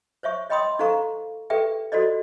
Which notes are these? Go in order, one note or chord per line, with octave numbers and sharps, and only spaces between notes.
C5 C#5 E5 C#6
C#5 D#5 G5 B5 C6 D#6
D#4 A4 C5 F5 A#5 C#6
G4 A4 B4 D5 E5 G5
F4 F#4 A4 C5 D5 D#5